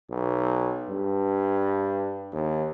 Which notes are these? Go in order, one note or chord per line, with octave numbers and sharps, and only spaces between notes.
B1
G2
D#2